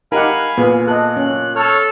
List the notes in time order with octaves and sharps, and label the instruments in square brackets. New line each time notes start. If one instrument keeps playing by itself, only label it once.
[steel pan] D#4 G4 F#5 [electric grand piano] A#4 [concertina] F5 G#5 B5
[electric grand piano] A#2 [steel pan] B3 G#4
[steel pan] A4 D#5 [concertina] F#6
[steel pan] C#4
[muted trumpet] A4 [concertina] C#5 F6